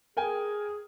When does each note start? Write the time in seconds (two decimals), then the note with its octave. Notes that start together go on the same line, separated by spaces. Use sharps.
0.17 G#4 A#4 G5 G#5